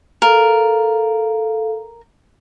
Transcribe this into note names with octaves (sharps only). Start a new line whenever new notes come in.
A4 A#4 F5